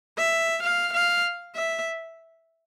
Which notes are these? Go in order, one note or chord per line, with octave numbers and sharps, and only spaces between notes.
E5
F5
F5
E5